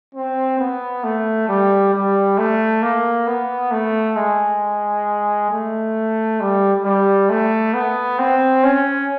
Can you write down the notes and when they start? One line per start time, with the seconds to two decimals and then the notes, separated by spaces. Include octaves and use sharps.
0.15 C4
0.59 B3
1.04 A3
1.48 G3
1.93 G3
2.38 A3
2.82 A#3
3.27 B3
3.71 A3
4.16 G#3
5.51 A3
6.40 G3
6.84 G3
7.29 A3
7.74 B3
8.19 C4
8.63 C#4